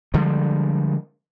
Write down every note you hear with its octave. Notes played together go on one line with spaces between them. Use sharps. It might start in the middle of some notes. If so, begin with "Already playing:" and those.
D3 F3 G3 G#3